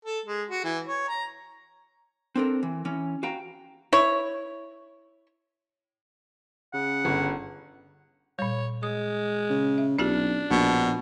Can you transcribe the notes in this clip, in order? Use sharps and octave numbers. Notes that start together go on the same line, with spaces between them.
A4
G#3
F#4
E3
C#5
A#5
C4 D4 A4 A#4
E3
E3 C#4
F#4 F5 G5 A#5
E4 C#5
C#3 F#5
G1
A#2 G3 C#5
G#3 D#6
C#3
E5
B1 C#4 D4 F4 G4
A#1 B2